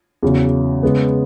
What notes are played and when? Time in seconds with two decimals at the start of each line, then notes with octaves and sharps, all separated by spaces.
0.23 E2 C#3 F#3
0.83 C#3 G#3 B3